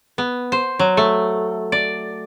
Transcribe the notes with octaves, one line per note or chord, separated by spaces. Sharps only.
B3
C5
F#3
A3
D5